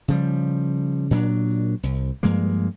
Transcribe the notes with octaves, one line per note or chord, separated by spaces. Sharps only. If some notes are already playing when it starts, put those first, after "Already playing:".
C#3 F3 G3
A#2 F#3 C4 D4
C2
G2 F3 G#3 A#3